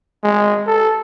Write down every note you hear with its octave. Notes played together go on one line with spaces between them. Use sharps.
G#3
A4